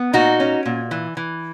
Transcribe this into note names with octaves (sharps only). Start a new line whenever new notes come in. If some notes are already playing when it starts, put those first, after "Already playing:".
Already playing: B3
A#2 D#4 F#4
C#4
A#2
E3
E3